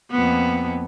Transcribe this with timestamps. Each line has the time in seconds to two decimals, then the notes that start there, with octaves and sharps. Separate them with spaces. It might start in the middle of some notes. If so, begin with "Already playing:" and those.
0.11 F2 A#3 B3